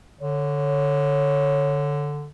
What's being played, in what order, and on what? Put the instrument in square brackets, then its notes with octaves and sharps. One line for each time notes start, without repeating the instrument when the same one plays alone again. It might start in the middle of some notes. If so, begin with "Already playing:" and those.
[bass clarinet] D3 [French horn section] C#5